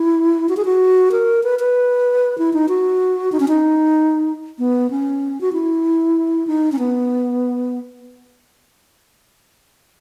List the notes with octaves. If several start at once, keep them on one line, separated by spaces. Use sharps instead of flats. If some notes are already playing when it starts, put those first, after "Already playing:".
Already playing: E4
F#4
G#4
F#4
A#4
B4
B4
E4
D#4
F#4
D#4
C#4
D#4
B3
C#4
F#4
E4
D#4
C#4
B3